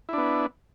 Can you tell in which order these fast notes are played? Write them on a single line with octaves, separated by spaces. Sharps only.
E4 D4 B3